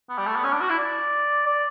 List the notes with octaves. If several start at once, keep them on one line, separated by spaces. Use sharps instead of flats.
B3
G3
A3
B3
C#4
D4
F#4
E4
D5
D5